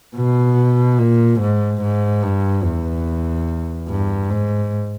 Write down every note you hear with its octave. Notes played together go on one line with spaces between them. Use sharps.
B2
A#2
G#2
G#2
G2
E2
G2
G#2